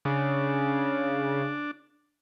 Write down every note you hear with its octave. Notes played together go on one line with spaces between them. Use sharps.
C#3 D4